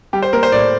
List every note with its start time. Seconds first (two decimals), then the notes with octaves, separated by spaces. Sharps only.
0.13 G3 G4
0.22 C5
0.33 A#3 A#4
0.43 C5
0.52 A2 D5